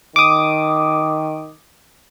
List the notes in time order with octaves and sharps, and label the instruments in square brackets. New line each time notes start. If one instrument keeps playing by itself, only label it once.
[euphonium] D#3 [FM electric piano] D6 D#6